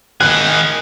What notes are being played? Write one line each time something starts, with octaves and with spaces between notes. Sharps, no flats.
D#3 G#4 F#6